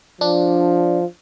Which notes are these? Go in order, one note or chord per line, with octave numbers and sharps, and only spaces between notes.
F3 D4